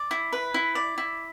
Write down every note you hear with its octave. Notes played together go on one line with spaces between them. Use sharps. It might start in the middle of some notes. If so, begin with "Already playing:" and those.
Already playing: D5
E4
B4
E4
D5
E4